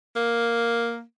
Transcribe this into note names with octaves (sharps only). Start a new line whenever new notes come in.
A#3